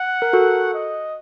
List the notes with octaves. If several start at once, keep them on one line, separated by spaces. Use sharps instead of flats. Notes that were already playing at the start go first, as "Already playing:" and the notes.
Already playing: F#5
A#4
F#4 A4
D#5